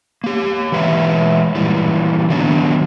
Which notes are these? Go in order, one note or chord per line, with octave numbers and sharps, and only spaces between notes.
A#3 G4
E3 G#3 B4 C#5 E5
A#2 E3 G3
D#3 F#3 A3 B3 D4